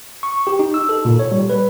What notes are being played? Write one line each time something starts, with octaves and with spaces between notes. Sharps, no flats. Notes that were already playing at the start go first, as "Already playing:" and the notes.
C#6
G4
D#4
E6
A4
A#2
C#5
G3
B4